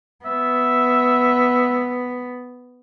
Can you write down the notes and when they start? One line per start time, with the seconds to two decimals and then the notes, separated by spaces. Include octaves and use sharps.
0.25 B3 E5